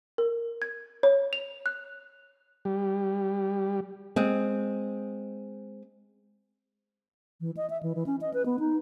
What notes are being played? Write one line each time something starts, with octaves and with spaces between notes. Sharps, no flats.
A#4
G#6
C#5
F7
F#6
G3
G#3 C4
E3
D#5
E5
E3
E3
C#4
D#5
B4
B3
D#4